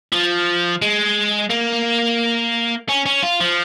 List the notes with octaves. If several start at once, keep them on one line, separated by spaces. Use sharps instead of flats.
F3
G#3
A#3
C#4
C#4
F4
F3